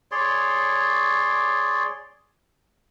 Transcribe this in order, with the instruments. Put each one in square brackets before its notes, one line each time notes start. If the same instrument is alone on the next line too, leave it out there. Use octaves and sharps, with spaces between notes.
[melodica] G#4 C#5 D5 C6